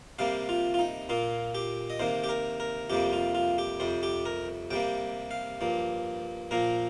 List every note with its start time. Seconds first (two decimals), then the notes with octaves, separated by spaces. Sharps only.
0.19 C3 G3 A#3 F5
0.49 F4
0.74 F4
0.79 D#4
1.09 A#2 A#3 F4
1.55 G4
1.90 D#5
1.99 C3 D#3 A#3 C5
2.24 G4
2.29 A#4
2.60 A#4
2.90 F2 C3 G3 A#3 G4
3.13 F4
3.35 F4
3.58 G4
3.80 F2 C3 G3 C5
4.03 G4
4.26 A#4
4.71 C3 G3 A#3 G5
5.31 F5
5.61 G2 F3 A#3
6.51 A#2 F3 A#3 A#4